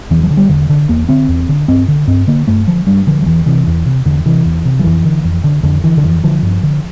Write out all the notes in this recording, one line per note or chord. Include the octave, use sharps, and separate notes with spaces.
E2 E3
F3
D3
G3
E2 D3
D3
E2 A#3
D3 C4
E2
D3
G2 C4
D3
G2 C4
D3 A#3
G2 A3
D3 F3
G2 G3
D3 F3
F3
E2 E3
C3 E3
E2
C3
E2 D3
C3 E3
E2
C3
F3
F2 E3
D3
F2
D3
F2 D3
D3 E3
D3
F2 E3
D3 F3
G2
D3